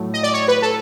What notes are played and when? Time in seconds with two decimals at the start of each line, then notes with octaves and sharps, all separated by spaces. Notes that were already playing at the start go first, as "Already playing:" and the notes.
Already playing: A2 F#3 A3
0.14 D#5
0.23 D5
0.34 C#5
0.48 B4
0.62 A4